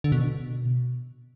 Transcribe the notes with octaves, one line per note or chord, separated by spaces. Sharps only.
D3
B2